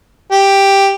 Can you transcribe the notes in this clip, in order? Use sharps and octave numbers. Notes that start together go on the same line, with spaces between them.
G4